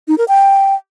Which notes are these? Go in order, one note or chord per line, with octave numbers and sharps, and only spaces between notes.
D#4
A#4
G5